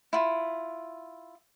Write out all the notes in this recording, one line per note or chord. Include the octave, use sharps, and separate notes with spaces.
E4 F4